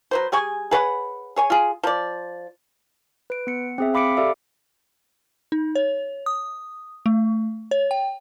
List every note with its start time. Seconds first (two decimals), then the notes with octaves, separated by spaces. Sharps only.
0.11 F#3 B4 C5
0.32 G3 G#4 G#5 C#6
0.71 G#4 B4 C#5 F#5
1.36 G#4 C#5 G#5
1.50 F4 G#4
1.83 F3 D5
3.30 B4 D7
3.47 B3 C#7
3.78 C4 G#4 E5
3.94 F5 B5 D6 B6 C#7 D7
4.17 G4 A4 D5 E5 F5
5.52 D#4
5.75 C#5
6.26 D#6
7.06 A3
7.71 C#5
7.91 G5